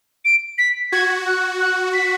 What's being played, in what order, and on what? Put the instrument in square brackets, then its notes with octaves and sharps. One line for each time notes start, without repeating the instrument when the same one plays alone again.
[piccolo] D7
B6
[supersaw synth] F#4 [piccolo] G#6
[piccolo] F#6
F#6
B6